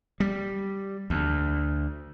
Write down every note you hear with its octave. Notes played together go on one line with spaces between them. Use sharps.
G3
D2